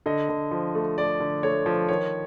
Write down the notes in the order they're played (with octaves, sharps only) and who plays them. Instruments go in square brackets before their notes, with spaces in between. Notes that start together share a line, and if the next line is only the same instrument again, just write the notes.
[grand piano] D3 D#5
D3
F3
A3
A3 D5
D3
A3 C#5
F3
D#3 C#5